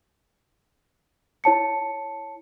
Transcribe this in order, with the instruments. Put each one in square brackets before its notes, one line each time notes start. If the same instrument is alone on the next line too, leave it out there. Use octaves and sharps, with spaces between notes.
[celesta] E4 C#5 A5 C#7